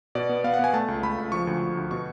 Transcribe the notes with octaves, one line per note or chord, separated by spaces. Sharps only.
B2 D5
B3
B3 F5
F#5
B3 G#5
A3 A5
C#2
A3 B5
C#2
F3 C#6
D2
D2
D2
B2 C#6